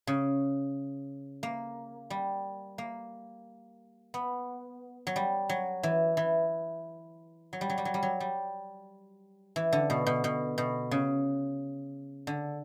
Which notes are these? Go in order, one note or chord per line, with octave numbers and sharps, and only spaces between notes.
C#3
A#3
G3
A#3
B3
F#3
G3
F#3
E3
E3
F#3
G3
F#3
G3
F#3
G3
F#3
G3
E3
D3
B2
B2
B2
B2
C#3
D3